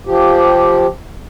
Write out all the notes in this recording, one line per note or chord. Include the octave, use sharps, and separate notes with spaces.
F3 G4